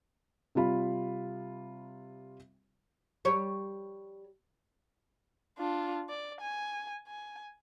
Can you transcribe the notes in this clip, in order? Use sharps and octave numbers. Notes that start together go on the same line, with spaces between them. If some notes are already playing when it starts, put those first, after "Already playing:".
C3 G3 F4 B5
G3 C#5
D4 F4
D5
G#5
G#5